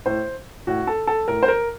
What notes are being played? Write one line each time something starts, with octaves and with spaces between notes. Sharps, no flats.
A2 C5
A2 F#4
A4
A4
A2 A#4
C5
A#4